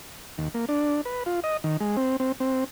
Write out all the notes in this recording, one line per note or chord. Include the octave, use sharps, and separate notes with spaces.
D#2
A#3
D4
B4
F4
D#5
D#3
G#3
C4
C4
C4